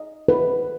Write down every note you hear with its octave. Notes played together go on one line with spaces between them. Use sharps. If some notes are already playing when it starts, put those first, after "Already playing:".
Already playing: D#5
B4